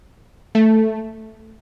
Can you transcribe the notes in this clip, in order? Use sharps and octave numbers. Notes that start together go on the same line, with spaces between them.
A3